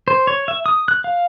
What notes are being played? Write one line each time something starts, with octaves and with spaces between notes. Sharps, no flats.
C5
C#5
E5
D#6
F#6
F5